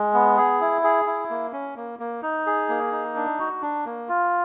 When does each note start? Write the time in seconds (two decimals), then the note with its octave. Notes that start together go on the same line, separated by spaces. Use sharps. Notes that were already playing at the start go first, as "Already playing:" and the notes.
Already playing: G#3
0.14 B3
0.37 G#4
0.61 E4
0.84 G#4
1.07 E4
1.30 A#3
1.53 C#4
1.76 A#3
1.99 A#3
2.23 D#4
2.47 G#4
2.69 A#3
2.92 D#4
3.16 D4
3.39 F#4
3.62 D4
3.86 A#3
4.09 F4